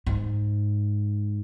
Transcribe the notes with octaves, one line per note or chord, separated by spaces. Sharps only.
G#2